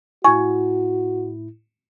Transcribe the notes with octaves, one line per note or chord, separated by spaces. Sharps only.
A2 E4 F#4 G#5 C#6